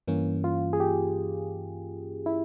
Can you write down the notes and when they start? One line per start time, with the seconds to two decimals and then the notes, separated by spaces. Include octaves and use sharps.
0.08 G2 E3 A#3 C#4
0.44 F4
0.73 G#4
0.80 G4
2.26 E4